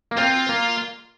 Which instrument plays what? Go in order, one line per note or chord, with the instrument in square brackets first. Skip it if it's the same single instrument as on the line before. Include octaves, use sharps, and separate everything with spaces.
[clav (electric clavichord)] A#3
[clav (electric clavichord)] C4 [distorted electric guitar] F4
[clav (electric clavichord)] A#3